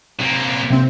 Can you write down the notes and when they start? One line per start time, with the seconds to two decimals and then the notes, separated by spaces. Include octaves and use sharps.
0.19 C3 A#3
0.70 C3 C4